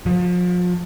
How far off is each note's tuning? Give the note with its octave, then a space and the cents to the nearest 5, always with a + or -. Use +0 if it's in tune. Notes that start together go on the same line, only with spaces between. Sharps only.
F3 +35